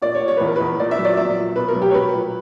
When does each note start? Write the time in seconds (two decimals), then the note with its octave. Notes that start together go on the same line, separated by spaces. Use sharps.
0.02 A#2 D5
0.15 C#5
0.21 A#2
0.28 C#5
0.37 E2 B4
0.47 A#4
0.56 E2 B4
0.80 A#2 D5
0.91 E5
0.98 F#3
1.05 D5
1.17 A#2 E5
1.37 A#2
1.56 B2 B4
1.68 A#4
1.76 F#3
1.82 G4
1.91 C#5
1.94 F#3 B4
2.13 A#2